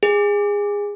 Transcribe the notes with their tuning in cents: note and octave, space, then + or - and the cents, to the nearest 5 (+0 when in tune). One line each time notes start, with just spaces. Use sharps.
G#4 -20